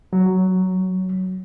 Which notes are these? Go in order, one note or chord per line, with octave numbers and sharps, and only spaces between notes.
F#3